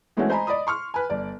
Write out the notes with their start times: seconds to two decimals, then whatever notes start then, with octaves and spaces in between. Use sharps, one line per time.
0.17 E3 G#3 A3 C4 C#4 F#4
0.30 C5 D#5 G#5 A#5 B5
0.47 D5 D#5 B5 D#6
0.67 C6 C#6 F6
0.94 B4 G#5
1.10 G1 D5